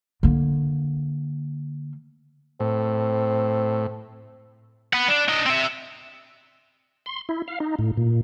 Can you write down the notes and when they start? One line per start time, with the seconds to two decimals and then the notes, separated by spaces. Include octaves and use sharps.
0.23 D3 A#3
2.60 A2 C4
4.93 B4 F#5
5.08 D4
5.28 D4 D#5
5.46 C4 E5
7.06 C6
7.29 E4
7.48 F5
7.60 D#4
7.79 A2
7.97 A#2